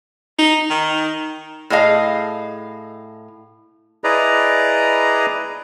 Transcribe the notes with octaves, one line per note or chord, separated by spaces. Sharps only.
D#4
D#3
A2 G#4 D#5 F5
E4 G#4 B4 D5 D#5 A#5